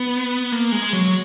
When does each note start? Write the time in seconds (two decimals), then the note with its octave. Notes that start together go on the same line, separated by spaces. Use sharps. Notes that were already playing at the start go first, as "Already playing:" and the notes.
Already playing: B3
0.52 A#3
0.72 G#3
0.93 F#3